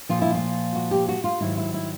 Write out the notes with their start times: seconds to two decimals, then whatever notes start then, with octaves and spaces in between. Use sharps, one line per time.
0.09 A#2 F3 F4
0.22 E4
0.35 F4
0.75 F#4
0.91 G4
1.08 F#4
1.24 F4
1.40 G#2 D#3 F#3 E4
1.57 E4
1.74 E4